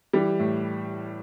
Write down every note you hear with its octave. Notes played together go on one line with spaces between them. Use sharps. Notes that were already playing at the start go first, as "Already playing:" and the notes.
E3 G3
A2